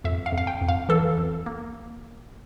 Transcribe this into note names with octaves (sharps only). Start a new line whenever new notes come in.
F2 E5
F5
F2
F5
G5
F2
F5
E3 A4
F2
A#3